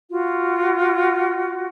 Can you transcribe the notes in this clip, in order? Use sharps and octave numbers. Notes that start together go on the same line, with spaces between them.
F4 F#4